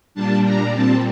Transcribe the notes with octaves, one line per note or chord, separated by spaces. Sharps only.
A#2 G3 D4 A5
A#5
A#2 G3 C4 A5